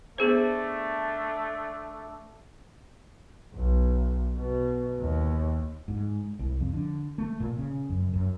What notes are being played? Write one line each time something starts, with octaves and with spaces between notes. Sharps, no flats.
A3 B3 D4 G#4 C5
B1
B2
D#2
G#2
C2
F2
D3
A3
A#2
C#3
F#2
F#2